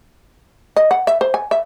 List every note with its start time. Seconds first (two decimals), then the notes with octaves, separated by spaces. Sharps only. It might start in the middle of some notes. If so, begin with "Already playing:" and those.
0.76 D#5
0.91 F#5
1.07 E5
1.21 C5
1.34 G#5
1.51 E5